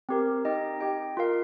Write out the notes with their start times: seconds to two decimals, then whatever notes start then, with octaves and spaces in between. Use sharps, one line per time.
0.09 C4 G4 A#4
0.45 D#4 G4 D#5 G5
0.80 G4 D#5 G5
1.17 F4 A#4 F5